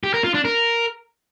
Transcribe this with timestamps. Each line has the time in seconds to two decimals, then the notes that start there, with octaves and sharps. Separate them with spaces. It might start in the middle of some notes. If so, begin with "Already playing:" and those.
0.03 G4
0.14 A#4
0.24 F4
0.34 D4
0.45 A#4